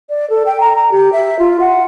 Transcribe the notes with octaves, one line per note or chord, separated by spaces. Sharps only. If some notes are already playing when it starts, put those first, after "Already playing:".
D5
A4
G5
A#5
A#5
G4
E5
F4
F#5